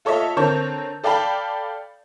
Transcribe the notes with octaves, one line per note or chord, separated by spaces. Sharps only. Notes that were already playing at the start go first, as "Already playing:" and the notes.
F4 A4 C#5 D#5 E5
D3 C4 A#4 C#5 A5 G6
A4 D5 F5 G5 A5 B5